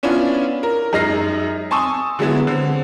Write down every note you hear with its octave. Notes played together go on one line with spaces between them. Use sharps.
B3 C#4 D4 E4 F4
A#4
F#2 G#3 D#4 F6 A#6 C7
G#5 A5 C6 C#6 D#6 E6
D3 F#3 G#3 B3 E4
D3 C4